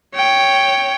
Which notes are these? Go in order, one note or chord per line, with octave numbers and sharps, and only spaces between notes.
C#5 G5